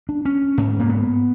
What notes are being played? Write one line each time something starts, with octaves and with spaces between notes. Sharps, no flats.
D4
C#4
G#2
A#3
B3